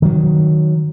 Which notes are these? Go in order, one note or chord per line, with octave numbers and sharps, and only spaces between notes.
D#3 F#3